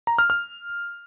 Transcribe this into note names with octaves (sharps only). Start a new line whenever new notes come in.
A#5
F6
F6